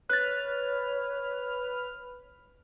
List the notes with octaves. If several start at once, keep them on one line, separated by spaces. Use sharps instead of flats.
B4 C#5 F6 F#6 A6